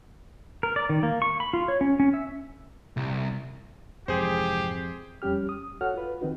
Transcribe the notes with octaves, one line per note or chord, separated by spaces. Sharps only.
A#4
D5
D#3
A#3
C#6
B5
F4
C#5
C#4
C#4
E5
C2
F2 G#2 C3 E3 G4 G#4 C5
F2 G3 C#4 G4 F6
D#6
F#4 A4 C#5 F#5 F6
F4 B4
D#3 C4 D#4 F#4